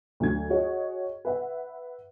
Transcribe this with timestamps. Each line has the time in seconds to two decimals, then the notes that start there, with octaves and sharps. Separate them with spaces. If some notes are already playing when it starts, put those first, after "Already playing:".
0.20 D2 F#3 G#6
0.50 F#4 G#4 C#5 D#5
1.25 B4 E5 F#5